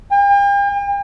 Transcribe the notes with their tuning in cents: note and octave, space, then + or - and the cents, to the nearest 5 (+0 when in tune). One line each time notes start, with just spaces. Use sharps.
G5 +45